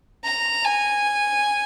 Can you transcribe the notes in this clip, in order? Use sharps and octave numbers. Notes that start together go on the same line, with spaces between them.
A#5
G#5